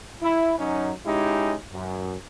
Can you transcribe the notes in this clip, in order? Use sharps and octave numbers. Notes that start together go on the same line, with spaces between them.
E4
F#2 F#3 C#4 D#4
G#3 C#4 D#4 E4 G4
F#2